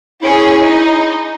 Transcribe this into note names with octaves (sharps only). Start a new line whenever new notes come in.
C#4 E4 G#4
D#4